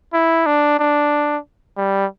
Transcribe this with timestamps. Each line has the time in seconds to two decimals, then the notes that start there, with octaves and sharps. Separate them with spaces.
0.14 E4
0.46 D4
0.79 D4
1.77 G3